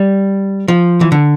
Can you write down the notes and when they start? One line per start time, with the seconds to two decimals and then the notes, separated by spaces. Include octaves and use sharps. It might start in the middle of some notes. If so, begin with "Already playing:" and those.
Already playing: G3
0.68 F3
1.01 E3
1.12 D3